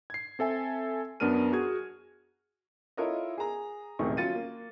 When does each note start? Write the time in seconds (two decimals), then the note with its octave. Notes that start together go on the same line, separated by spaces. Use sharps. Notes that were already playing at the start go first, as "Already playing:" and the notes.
0.10 G#6 C7
0.39 C4 A4 E5 G#5
1.20 F#2 B3 D4 A#4 F6 D#7
1.53 F#4 G#4 G#6
2.97 E4 F4 A4 A#4 C#5 D#5
3.38 G#4 A#5
3.99 D#1 C3 D#3 A3 G#4 C#6
4.17 F#3 C#4 F4 A6 C#7 D#7
4.35 A#3